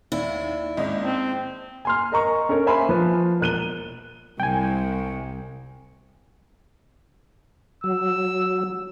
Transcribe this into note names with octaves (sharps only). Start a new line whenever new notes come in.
D#2 E4 D5
G#1 A#3 C#4 D#5
C4 A5
G#5 C6 F6
A#4 D#5 A#5 C#6
C#4 A4 A#4 C#5
A#3 C5 E5 G#5 B5 C6
F3 B4
E1 F#6 D#7 G7
C2 G5 G#5
F#3 E6